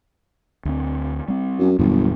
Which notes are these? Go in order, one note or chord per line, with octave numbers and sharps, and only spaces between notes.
D2 C4
G3 C4
F#2
G1 E2 A#2 F#3